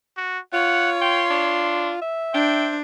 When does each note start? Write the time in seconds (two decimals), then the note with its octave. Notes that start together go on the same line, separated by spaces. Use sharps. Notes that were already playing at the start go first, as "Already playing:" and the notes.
0.17 F#4
0.53 F4 C#5 F#5
1.02 G5 C6
1.30 D4
2.02 E5
2.34 D4 C5 G5